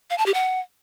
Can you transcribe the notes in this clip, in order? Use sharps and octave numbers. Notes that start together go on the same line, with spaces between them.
F5
A5
G4
F#5